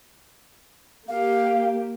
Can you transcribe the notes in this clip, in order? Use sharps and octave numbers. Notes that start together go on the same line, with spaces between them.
A#3 G4 F5